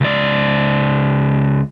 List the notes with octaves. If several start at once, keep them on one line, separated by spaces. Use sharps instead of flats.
C#2 D5